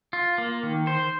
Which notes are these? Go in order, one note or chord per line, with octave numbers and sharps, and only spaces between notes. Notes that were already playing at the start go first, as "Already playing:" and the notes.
F4
A#3
D#3
C5